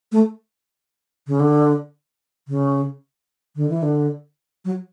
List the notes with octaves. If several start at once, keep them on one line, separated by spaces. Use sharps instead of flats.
A3
C#3
D3
C#3
D3
E3
D3
F#3